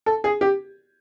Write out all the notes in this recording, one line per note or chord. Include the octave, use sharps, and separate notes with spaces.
A4
G#4
G4